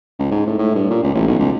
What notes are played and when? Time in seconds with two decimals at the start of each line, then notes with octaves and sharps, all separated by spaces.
0.19 C#2
0.31 G#2
0.47 A2
0.58 A2
0.75 G2
0.90 A#2
1.03 C#2
1.15 A1
1.27 B1
1.39 C#2